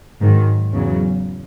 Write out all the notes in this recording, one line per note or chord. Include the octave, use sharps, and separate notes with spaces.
G#2 D#3 F#3
E2 C#3 F#3